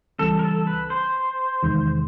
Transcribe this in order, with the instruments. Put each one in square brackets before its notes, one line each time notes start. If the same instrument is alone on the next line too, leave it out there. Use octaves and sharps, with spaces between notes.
[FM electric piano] C#2 C#3 E3 G3 C4 [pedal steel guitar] A4
[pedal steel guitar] A#4
A4
B4
C5
[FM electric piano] E2 C3 D#3 G#3